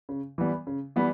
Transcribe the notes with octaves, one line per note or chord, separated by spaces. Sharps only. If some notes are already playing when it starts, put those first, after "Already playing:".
C#3
E3 G3 B3
C#3
E3 G3 B3